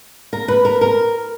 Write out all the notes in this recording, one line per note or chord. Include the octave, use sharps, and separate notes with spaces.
A#4
B4
A#4
A#4